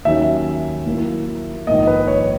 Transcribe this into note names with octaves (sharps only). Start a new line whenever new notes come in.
D#2 D#3 F#3 C#4 E5
A#2 F#3 A#3 E4
A#1 G#2 D#3 A#3 D#5
B4
C#5